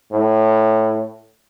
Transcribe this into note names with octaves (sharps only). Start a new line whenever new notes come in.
A2